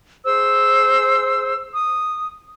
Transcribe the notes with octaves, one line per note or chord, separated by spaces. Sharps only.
G#4 C5 E6
D#6